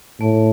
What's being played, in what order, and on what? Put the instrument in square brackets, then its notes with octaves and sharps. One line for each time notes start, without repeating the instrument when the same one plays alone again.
[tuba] A2 [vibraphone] A3